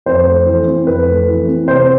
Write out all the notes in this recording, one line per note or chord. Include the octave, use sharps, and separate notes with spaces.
F2 C5
A3
E3
C4
F2 B4
A3
E3
C4
C3 C5